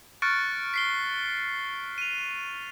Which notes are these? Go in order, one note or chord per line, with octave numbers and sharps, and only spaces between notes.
C#6 F6 F#6 A6 C#7 D7
B6 C7 G7
D#7 F7